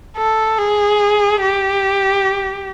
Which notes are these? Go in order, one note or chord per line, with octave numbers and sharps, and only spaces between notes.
A4
G#4
G4